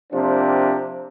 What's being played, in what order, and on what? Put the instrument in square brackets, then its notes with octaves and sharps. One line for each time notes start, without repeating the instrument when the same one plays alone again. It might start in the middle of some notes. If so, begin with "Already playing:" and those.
[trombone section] C3 F3 A#3 C4 D4